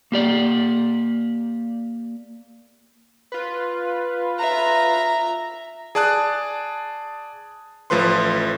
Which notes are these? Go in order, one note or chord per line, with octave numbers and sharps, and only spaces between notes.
A#3 G4 D5
F4 B4
E5 A#5
G#4 D5 A5 D#6 F#6
A1 F3 A3 B4 C6